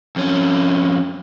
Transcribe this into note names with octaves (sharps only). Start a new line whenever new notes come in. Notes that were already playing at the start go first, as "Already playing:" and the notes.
F2 C#4